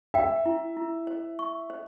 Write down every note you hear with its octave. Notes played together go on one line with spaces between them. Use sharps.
E5 G5
E4
E4
C5
C#6
C5